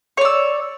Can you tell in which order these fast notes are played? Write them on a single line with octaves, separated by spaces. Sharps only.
C#5 D5 E6